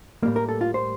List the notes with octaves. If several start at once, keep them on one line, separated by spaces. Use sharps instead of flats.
A2 G3 A#3
A#4
A4
F4
C5